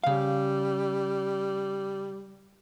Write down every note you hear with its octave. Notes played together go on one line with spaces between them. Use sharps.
C#3 G3 F5